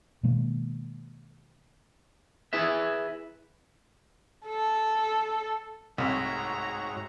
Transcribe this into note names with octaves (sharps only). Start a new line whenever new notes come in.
B2 D#3 G#3 A#3
E4 G#4 B4 E5
A4
C2 G#2 A3 F#4 C#5 A#5